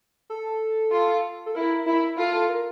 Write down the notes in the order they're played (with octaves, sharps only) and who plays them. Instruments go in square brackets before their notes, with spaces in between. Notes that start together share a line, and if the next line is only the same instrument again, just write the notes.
[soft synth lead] A4
[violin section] F4
[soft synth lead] A4
[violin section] E4 [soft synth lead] A#4
[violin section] E4
[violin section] F4 [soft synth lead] A4
[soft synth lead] A4
A#4